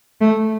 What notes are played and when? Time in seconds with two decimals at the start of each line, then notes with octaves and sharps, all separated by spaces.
0.20 A3